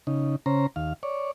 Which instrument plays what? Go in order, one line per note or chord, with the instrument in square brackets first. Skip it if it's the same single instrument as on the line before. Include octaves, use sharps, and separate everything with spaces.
[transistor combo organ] C#3 D#4
C#3 C#4 C5 A#5
D#2 F5
C#5 D5